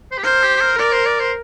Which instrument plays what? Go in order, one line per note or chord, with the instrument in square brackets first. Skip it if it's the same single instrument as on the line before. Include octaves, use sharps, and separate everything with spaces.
[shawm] C5
G4
[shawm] A#4 [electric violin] C5
[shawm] G4
G4
A#4
[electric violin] A#4 [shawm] D5
[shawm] C5
D5
C5